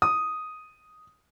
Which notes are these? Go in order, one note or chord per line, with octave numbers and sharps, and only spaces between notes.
D#6